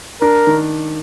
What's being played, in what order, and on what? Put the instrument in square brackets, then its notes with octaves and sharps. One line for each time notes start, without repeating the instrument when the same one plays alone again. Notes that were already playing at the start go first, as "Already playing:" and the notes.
[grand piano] D4 [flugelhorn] A#4
[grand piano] D#3